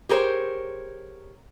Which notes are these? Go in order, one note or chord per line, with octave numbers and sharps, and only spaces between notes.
G4 G#4 A#4 C5 C#5